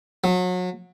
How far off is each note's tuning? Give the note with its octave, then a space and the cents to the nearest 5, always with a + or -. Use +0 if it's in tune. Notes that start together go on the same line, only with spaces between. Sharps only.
F#3 -30